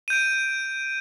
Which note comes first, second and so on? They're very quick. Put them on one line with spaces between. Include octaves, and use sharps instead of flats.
D#7 G6 D7